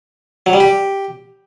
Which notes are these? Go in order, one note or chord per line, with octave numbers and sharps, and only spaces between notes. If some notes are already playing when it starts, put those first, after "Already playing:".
F#3
G3
G4